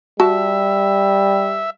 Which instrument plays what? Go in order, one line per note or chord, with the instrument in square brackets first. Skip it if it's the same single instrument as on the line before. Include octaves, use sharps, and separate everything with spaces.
[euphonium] G3 [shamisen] F#4 A5 [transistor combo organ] E5